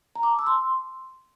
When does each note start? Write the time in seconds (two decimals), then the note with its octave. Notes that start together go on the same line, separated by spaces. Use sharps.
0.15 A#5
0.23 D6
0.31 A5
0.39 E6
0.47 C6